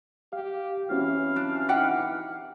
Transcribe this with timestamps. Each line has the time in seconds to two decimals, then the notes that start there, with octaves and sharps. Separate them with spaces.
0.33 G4 F5
0.90 E3 C4 C#4 F#4 F5
1.36 D4
1.69 D#4 G4 F#5